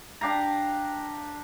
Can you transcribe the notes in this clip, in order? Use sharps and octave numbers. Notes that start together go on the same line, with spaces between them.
D4 G4 F5 A#5